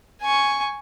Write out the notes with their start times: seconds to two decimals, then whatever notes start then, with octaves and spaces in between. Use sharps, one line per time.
0.22 G#5 C#6